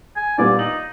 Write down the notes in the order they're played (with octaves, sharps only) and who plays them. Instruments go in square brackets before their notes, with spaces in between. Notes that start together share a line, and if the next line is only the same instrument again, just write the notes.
[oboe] G#5
[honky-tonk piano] A#2 G3 B3 [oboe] D5
[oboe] D#4 [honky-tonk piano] F#7